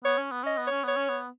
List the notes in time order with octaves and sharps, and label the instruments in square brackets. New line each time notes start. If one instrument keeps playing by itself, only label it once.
[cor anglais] B3 [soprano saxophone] C#5
[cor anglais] C#4
B3
[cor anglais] C#4 [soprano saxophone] D#5
[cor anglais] B3
[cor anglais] C#4 [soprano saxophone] C#5
[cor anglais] B3 [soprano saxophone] C#5
[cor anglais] C#4
B3